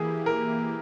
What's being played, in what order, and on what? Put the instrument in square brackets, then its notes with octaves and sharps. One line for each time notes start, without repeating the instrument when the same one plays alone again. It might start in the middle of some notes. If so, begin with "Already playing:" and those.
Already playing: [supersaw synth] E3 A#3 E4 G4 [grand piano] G#4
[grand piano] A#4